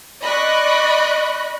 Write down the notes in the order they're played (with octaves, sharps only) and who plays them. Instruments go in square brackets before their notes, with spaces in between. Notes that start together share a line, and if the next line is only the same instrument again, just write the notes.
[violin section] D5 D#5 B5 C#6 F#6